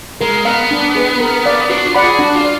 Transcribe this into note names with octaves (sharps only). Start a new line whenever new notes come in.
G#3 A#4
B3 F5 A#5
D4
G#4 B4
A#4
D5 F5
D4 F#4
F4
D5 F#5 B5
G#4
D4 F#4
F4
D5